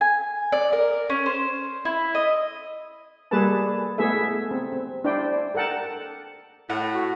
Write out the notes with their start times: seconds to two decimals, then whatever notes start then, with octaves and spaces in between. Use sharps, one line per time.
0.01 G#5
0.52 D5
0.73 A#4
1.10 C#4
1.26 C5
1.85 E4
2.15 D#5
3.31 G3 A#3 G#4 A4 B4 A5
3.98 A3 B3 E4 G#4 A4 E5
4.51 C4
4.73 C4
5.04 D4 E4 C5 D5 G5
5.55 A4 A#4 F#5 G5 A5
6.70 A2 F#5
6.94 F#4